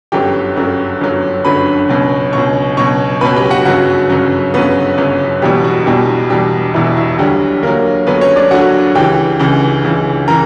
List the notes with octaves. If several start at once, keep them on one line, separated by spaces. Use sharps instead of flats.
G1 F#2 D3 F#3 G4 G5
G1 F#2 D3 F#3
G1 F#2 D3 F#3
G1 F#2 D3 F#3 B4 B5
C#2 B2 F#3
C#2 B2 F#3 C#5 C#6
C#2 B2 F#3 C#5 C#6
C#2 B2 F#3 B4 B5
G4 G5
F#4 F#5
G1 F#2 C#3 F#3 F#4 F#5
G1 F#2 C#3 F#3
G1 F#2 C#3 F#3 B3 B4
G1 F#2 C#3 F#3
E1 E2 B2 G3 G4
F#4
E1 E2 B2 G3 G4
E1 E2 B2 G3 G4
E1 E2 B2 E4
E4
D2 D3 F#3 G3 G4
D2 D3 F#3 A#3 A#4
D2 D3 F#3 B3 B4
C#4 C#5
D4 D5
D2 D3 F#3 F#4 F#5
C#2 C#3 E3 G4 G5
C#2 C#3 E3
C#2 C#3 E3
C#3 E3 A#4 A#5